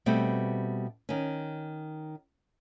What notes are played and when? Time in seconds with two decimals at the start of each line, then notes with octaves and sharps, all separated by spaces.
0.06 B2 G3 A3 C4
1.09 D#3 C#4